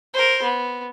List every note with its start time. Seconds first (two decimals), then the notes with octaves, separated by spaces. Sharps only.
0.14 A#4 C5
0.43 B3